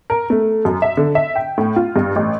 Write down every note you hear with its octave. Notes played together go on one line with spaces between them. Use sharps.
A#4
A3
F#2
E5
D3
E5
G5
A2
F4
G2
A1